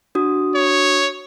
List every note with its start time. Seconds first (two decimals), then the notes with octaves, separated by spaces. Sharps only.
0.15 D4 F#4 D#6
0.55 C#5